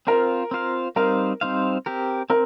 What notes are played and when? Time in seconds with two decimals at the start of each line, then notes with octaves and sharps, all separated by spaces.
0.07 C4 F4 A#4 C5 F5
0.51 C4 F4 C5 F5
0.96 G3 C4 D#4 A#4 C5 F5
1.41 G3 C4 D#4 C5 F5
1.86 C4 G4 A#4
2.30 C4 A#4